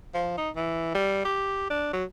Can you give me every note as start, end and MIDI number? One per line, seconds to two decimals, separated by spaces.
0.14 0.35 53
0.37 0.49 63
0.56 0.92 52
0.94 1.22 55
1.25 1.67 67
1.70 1.90 62
1.93 2.04 54